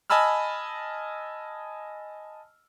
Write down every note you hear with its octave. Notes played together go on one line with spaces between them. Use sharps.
D#5 G#5 A5 B5 E6 F6